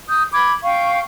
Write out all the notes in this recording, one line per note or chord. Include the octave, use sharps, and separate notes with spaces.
D#6 G6
B5 D6 G#6
F5 G5 C#6